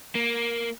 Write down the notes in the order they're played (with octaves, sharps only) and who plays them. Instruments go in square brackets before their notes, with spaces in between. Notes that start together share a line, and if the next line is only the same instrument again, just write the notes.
[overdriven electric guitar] A#3